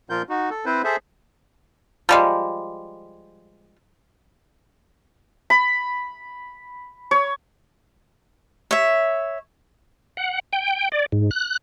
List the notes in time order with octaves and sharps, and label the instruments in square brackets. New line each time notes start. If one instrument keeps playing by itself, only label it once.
[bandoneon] A#2 F3 F4 A#4 G6
D#4 F#4
A4
C4 E4 B4 C5
G#4 A4 C5 E5
[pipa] F3 G3 G#3
[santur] B5
C#5
[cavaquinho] C#5 E5
[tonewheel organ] F#5
G5
D5
G#2
F#6